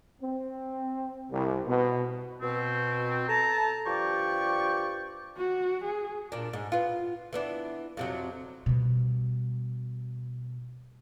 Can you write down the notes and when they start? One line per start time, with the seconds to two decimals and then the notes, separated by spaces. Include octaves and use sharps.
0.22 C4
1.30 C2
1.67 B2
2.41 B2 C4
3.28 A4 A5 A#5
3.86 G2 F3 G4 D5 G5 C#6
5.37 F#4
5.84 G#4
6.32 A#2 D4
6.53 G#2
6.72 B3 F4
7.33 E3 B3 D4
7.97 F2 C3 F#3
8.66 B2 G3